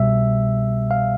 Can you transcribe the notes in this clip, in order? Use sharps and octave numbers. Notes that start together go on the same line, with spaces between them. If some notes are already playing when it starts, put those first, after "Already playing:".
Already playing: C2 B2 G3 E5
F5